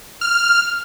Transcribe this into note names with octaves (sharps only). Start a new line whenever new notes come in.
F6